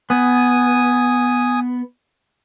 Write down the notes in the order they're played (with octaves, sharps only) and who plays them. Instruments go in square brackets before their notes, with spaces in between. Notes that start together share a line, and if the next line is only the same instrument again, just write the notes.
[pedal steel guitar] B3 [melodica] G#5 D#6